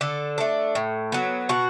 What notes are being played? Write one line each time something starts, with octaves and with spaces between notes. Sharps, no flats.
D3 A4
A3 D4
A2
F#3 B3
B2 F#4